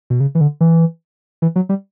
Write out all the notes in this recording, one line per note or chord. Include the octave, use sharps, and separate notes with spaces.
B2
C#3
E3
D3
E3
E3
F#3
G3